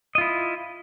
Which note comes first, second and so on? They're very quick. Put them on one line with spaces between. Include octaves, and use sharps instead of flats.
D#5 F4 E4